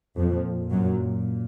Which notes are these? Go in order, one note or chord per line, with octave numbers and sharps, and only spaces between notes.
F2 A#2 F3
F#2 F#3